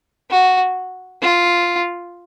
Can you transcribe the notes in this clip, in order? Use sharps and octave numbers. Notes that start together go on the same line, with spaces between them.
F#4
F4